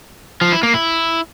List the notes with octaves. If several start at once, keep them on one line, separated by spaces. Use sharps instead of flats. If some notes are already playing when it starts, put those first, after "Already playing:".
F3
E4
A#3
E4